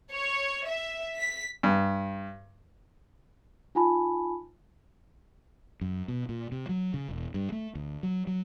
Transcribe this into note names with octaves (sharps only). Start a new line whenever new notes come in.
C#5
E5
B6
G2
D#4 F4 G#5 A5 B5
F#2
B2
A#2
C3
F#3
C#3
E1
G2
A3
D2
F#3
F#3